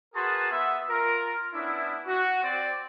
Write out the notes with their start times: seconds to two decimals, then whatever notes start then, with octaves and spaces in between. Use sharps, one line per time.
0.15 F#4 G#4 A#4 B4 A5 C6
0.51 B3 E5
0.89 F4 A#4
1.54 B3 C#4 D4 E4
2.06 F#4
2.43 C4 D5